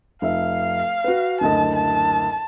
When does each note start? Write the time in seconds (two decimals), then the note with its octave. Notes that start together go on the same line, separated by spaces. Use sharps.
0.22 F1 E5 F5
1.04 F#4 B4
1.41 F#1 D2 D#5 A5
1.76 A5